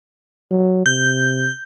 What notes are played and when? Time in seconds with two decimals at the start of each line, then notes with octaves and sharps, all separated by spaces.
0.51 F#3
0.86 C3 G6